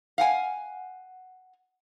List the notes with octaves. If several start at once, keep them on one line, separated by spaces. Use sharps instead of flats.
F5 F#5 G#5